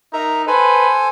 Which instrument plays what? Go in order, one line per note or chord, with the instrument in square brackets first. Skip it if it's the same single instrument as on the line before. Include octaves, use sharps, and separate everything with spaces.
[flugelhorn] D#4 [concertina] A#4 E5 A#5
[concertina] A4 C5 G#5 [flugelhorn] B4